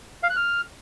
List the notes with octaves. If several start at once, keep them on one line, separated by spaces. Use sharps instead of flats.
F5
F#6
F6